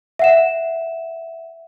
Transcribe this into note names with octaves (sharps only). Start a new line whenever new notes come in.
E5 F#5 E7